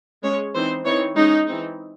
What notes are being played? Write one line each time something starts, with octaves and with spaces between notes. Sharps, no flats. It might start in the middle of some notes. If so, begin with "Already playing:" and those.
G#3 C#4 C#5
E3 C4 D#4 C5
E3 C4 D#4 C#5
G#3 C#4 D#4
E3 C4 D#4